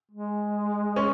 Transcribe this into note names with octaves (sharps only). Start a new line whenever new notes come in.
G#3
C#4